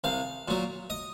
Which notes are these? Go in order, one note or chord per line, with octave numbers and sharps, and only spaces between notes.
C2 F5
A#2 F#3
D#5